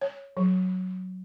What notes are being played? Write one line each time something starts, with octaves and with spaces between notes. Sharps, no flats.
C#5
F#3